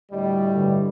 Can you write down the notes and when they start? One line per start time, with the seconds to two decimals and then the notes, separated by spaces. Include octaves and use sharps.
0.12 D2 A2 G3 D#5
0.52 G2 D3